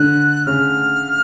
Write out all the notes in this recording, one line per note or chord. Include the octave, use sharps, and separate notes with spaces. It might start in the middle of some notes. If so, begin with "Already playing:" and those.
Already playing: D3 F#6
C#3 F6